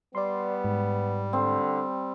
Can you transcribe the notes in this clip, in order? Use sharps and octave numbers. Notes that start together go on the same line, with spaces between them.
G3 B3 D5 C6
G#2
D3 C4